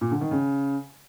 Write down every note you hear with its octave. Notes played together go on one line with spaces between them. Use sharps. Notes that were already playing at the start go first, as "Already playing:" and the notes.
A#2
D3
D#3
C#3